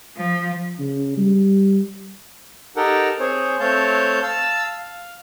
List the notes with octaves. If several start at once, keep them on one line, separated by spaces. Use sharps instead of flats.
F3
C#3
G3
D#4 G4 A4 A#4 F#5 G5
C4 G#4 C5 C#5
A3 C4 C#5 F5 A5 G6
F5 A5 E6
F5